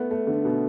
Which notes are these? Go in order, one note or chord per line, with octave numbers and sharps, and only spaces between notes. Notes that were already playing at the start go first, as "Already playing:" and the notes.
Already playing: A3 B3
A3
D3
B2